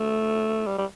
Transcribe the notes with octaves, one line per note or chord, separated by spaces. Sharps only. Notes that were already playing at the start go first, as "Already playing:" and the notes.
Already playing: A3
G3
G3